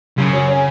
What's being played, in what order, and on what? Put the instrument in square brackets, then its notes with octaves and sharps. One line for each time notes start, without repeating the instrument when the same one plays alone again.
[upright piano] F#2 [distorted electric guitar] C#3
[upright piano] F#3
C#4